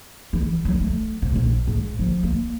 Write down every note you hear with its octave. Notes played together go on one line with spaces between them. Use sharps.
E3
F#3
A3
C3
A#1
G#2
F3
A#3